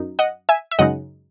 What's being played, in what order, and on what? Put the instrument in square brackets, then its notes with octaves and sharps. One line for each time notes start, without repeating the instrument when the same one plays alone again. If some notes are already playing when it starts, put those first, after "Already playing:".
Already playing: [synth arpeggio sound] F#2 D#4
D#5 F#5
E5 G#5
E5
F#2 C#3 G#3 D#4 D#5 F#5